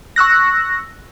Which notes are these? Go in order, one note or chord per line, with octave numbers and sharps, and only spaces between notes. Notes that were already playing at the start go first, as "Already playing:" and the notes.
C#6 E6 F#6 A#6